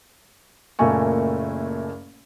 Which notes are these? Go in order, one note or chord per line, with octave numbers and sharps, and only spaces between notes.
F#1 A#2 A3 A#4 G#5 C#6